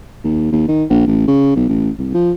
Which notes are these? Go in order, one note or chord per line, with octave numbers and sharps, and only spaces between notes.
D#2
D#2
D#3
A#1
A1
C#3
B1
A1
C2
F3